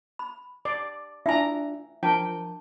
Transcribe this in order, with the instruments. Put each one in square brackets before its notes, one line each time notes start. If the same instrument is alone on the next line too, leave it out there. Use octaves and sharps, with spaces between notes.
[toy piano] B5
[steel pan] D5
[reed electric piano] D4 F4 [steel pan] E4 A#5 [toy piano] E5 G5 G#5
[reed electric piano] F3 A#4 [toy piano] D4 A5 [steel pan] G5